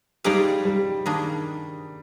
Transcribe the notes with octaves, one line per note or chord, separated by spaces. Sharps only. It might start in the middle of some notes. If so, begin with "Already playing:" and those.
G3 G#3 D#4 G#4 D5 F5
G3
D#3 A#3 D4 G#4